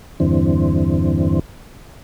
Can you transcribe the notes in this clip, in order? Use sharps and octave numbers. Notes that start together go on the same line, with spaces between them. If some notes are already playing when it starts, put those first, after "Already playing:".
E2 G2 D3 E3 C4